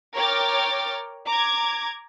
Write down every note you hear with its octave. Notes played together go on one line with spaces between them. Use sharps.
A#4 C#5 G5 D6 F6 A6
A#5 D6 G#6